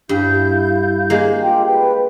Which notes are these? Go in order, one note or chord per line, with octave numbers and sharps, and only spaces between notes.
G2 E4 F5 G6
G#3 A#3
F4 G4 G5
B4 G5